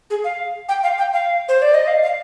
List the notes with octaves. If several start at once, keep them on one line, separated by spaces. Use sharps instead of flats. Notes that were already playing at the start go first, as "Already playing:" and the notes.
G#4
F5
G5
F5
G5
F5
C5
D5
D#5
F5
F5